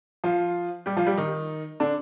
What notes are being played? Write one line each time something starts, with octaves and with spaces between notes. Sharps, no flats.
F3 F4
G3 G4
F3 F4
G3 G4
D#3 D#4
D3 D4